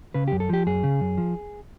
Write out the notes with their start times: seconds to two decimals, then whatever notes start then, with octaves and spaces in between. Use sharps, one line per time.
0.14 C#3 B4
0.28 F#2 G4
0.40 A4
0.49 F3 G4
0.67 F#2 G#4
0.84 C#3
1.01 F#2
1.18 F3